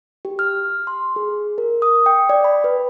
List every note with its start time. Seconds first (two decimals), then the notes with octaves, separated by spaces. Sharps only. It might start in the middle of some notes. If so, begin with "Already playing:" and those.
0.25 G4
0.39 F6
0.87 C6
1.16 G#4
1.58 A#4
1.82 D#6
2.06 G5
2.29 D5
2.44 B5
2.64 B4